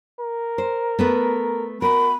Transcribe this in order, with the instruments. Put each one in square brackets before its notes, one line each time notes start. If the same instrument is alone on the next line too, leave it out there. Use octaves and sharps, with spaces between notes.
[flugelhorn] A#4
[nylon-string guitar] C5
A3 B3 B4
[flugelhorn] F#4 [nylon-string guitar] A#4 [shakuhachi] B5